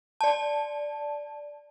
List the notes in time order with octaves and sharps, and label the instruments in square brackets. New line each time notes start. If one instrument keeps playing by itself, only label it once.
[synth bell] D5 A5